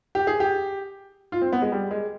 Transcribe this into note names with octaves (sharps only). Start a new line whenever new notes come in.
G4
G#4
G4
F4
C4
B3
G#3
G3
G#3